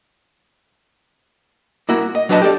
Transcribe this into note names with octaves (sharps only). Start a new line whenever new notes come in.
A#3 E4 F#4
D#5
F#3 D4 B4 D#5 A5
G4 A4 D5